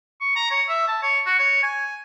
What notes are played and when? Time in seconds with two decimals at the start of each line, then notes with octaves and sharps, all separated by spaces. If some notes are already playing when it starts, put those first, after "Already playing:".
0.21 C#6
0.35 A#5
0.51 C#5
0.68 E5
0.88 A5
1.03 C#5
1.26 F#4
1.39 C#5
1.63 G#5